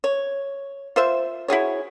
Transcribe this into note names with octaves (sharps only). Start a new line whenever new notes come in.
C#5
F4 C5 E5
E4 F#4 G#4 C#5